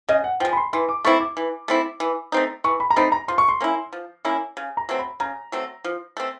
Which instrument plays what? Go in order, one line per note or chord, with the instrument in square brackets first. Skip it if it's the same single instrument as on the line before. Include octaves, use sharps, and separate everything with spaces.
[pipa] C#3 [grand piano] D#5
[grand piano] F#5
[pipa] F3 [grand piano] G5
[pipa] G#3
[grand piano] B5
C6
[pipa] E3 [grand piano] C6
[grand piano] D6
[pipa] A3 C4 E4 [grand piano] C#6
[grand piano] D6
[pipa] E3
A3 C4 E4
E3
A3 C4 D#4
[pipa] E3 [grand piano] C#6
[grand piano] B5
A#5
[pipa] A3 C4 D#4 [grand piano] B5
[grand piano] A#5
[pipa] F3 [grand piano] C6
[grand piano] C#6
C6
[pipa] A#3 C#4 E4
F3
A#3 C#4 E4
C#3
[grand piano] A#5
[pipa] F#3 A3 C4
[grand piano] B5
[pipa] C#3 [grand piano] A#5
[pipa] F#3 A3 C4
F3
A3 C4